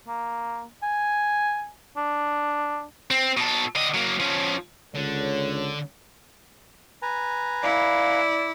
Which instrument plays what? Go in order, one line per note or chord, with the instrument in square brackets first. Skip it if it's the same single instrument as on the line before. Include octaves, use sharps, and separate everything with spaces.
[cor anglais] A#3
G#5
D4
[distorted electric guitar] C4
B2 A4
D3 D#5
F#3 A#3
F3 C#4
[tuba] C#2 [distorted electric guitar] D3 [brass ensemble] A4 C#5
[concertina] B4 G#5 A#5
[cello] E4 [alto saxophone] D5 [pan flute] F5